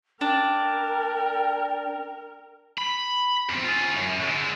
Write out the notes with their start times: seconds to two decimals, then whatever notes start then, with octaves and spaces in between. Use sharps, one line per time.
0.21 D4 A#4 G5
2.78 B5
3.49 E2 C4
3.64 F4 G#4
3.96 F#2
4.20 D3 G#3